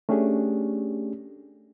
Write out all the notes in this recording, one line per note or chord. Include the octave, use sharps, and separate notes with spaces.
A3 C#4 D4 G4 G#4